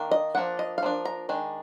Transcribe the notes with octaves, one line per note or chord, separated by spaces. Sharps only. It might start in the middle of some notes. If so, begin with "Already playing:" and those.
Already playing: D#3 A#3 D4
D#5
F3 A#3 D4 F#5
D#5
F5
F3 A#3 D4
A#5
D#3 G#3 D4